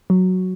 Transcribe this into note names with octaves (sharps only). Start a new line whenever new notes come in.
F#3